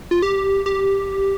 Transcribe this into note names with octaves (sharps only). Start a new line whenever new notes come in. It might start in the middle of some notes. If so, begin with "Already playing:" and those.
F4
G4
G4